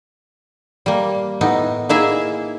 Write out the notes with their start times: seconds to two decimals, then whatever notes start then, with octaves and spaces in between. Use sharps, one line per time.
0.86 G3 A#3
1.41 A2 B3 D#4
1.89 A#3 D#4 E4 G#4 E5